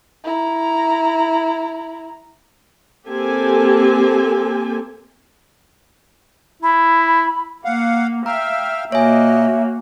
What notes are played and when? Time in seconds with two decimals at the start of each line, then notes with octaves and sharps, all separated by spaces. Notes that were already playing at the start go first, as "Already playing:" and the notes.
0.24 E4 A#5
3.07 A#3 C4 G4 A4 G#5
6.62 E4 B5
7.65 A#3 F5 F#5
8.26 E5 F5 G5 A#5 F6
8.92 A#2 A#3 F#4 C#5 D#5 E5 G#5